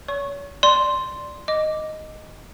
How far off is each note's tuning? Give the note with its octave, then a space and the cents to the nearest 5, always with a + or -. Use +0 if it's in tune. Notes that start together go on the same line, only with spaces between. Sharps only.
C#5 +35 C#6 -15
D5 +0 C6 +0
D#5 +0 D6 +0